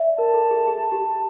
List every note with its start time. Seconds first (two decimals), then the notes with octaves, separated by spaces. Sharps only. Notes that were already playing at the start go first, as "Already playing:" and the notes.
Already playing: D5 E5
0.18 A#4 A5
0.34 A4
0.51 G#4
0.67 G#4
0.92 G4